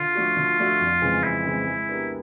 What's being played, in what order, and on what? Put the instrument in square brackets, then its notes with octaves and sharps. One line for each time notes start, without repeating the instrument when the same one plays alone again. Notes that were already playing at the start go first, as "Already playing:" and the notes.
Already playing: [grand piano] D3 [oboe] F4
[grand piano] F3 A3 D4 F#4
D3
F3 A3 D4 F#4
F2
C#3 E3 G#3 C4
[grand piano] F2 [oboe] E4
[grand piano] C#3 E3 G#3 C4
G#3
B3 D4 G4 A#4